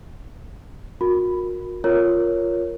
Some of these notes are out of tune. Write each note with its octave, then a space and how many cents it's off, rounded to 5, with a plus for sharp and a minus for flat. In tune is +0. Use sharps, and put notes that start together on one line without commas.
F#4 -40 A#4 +0
F4 +0 A#4 +0 C#5 +0